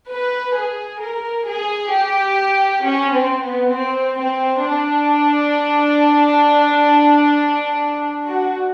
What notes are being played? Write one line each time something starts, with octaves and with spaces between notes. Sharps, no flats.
B4
G#4
A#4
G#4
G4
C#4
C4
B3
C4
C4
D4
F#4